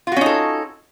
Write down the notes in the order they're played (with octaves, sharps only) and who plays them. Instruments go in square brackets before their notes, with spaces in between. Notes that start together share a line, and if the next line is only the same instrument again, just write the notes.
[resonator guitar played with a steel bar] F4
F#4
C#4
D#4
A4